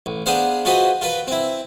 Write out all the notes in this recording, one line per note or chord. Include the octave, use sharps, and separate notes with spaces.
A1
B3 D4 G#4 C5 F5
F4 F#4 G#4 B4 C5 D#5
F4 A#4 B4
C4 E4